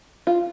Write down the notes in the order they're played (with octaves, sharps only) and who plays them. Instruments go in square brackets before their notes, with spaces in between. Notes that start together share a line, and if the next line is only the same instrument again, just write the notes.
[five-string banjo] F4